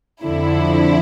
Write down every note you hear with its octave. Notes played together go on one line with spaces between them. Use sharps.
F2 D3 F3 E4